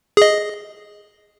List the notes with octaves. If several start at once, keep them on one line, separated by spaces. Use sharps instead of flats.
G#4 D#5